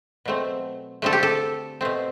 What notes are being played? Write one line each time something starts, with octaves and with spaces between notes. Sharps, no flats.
B2 F#3 A3 C4
D3 A3 C4 A4
G4
A4
B2 A3 C4